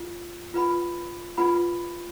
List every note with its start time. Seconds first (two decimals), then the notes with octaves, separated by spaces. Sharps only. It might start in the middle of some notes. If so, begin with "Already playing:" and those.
Already playing: F4
0.54 F4 B4 F#5 B5
1.37 F4 B4 F#5 B5